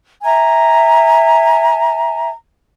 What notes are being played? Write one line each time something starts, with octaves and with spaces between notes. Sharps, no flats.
E5 G#5 A#5